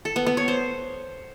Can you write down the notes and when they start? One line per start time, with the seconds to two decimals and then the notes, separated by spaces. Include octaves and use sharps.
0.05 A4
0.16 B3
0.26 B3
0.37 C#5
0.48 C5